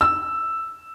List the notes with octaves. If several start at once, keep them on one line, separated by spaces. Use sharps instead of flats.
E6